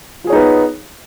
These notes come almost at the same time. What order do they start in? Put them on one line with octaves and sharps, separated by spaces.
F4 G#4 C#5 D#4 B3